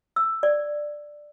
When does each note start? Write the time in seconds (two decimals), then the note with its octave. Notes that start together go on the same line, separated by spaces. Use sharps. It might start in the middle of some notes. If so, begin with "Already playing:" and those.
0.16 E6
0.43 D5